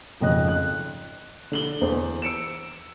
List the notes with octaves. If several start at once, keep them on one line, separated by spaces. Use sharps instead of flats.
G#1 F2 C#3 D#5 F#6
F#6
D3 F#7 G7
E2 C5
E6 C#7 D7 E7